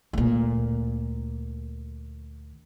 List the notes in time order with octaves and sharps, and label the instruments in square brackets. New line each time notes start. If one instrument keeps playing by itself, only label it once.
[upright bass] D2 A#2